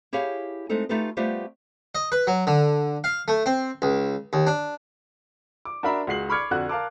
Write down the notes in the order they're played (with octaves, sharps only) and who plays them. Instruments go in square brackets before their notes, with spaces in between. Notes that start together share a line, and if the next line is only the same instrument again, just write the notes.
[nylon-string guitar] E4 G4 G#4 C#5 F5
G#3 A3 C4 D#4 A4
A3 D#4 F4 G4 A4 B4
G3 A3 B3 F4 G4 C5
[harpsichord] D#5
B4
F#3
D3
F5
A3
C4
C#2
D#2
D4
[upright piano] D6
D4 F#4 A#4 E5 A#5 B5
C#2 F#4 G#4 C7 F#7
B5 C#6 D6 F6 G#6 C#7
F2 D3 F#4 F#6
A#4 F5 A5 D6